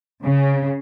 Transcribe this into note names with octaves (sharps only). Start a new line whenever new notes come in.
C#3